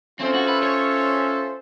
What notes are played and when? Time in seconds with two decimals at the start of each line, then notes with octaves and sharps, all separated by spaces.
0.20 C4 C#4 F4 A4 C5 E5
0.35 F#4
0.48 B4
0.63 C#5